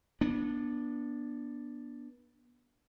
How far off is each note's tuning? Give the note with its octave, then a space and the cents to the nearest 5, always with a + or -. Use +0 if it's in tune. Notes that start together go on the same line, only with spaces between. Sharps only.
B3 -30 D4 +0